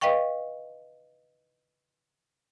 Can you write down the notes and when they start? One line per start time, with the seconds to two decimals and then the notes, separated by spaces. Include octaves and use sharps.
0.01 B4 D#5 F5 G5 C#6